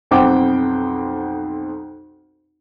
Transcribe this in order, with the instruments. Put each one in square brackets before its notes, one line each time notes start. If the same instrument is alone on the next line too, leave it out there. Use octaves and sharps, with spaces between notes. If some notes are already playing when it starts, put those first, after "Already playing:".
[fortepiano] B1 F2 C4 F#5 G5 D6